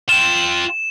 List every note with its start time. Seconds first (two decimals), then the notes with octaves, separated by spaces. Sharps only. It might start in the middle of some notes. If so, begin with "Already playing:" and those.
0.09 F4 G5 E7